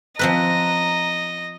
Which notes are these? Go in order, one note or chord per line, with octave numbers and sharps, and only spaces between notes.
F3 C4 B4 D#5 A#5